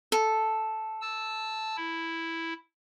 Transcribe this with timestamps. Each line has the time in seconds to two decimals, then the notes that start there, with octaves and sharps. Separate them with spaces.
0.12 A4
1.01 A5 E6
1.77 E4